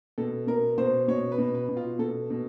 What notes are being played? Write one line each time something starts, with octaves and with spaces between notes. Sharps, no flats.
B2 A4
B2 A#4
B2 C5
B2 C#5
B4
B2
B4
B2
F4
B2 A4
B2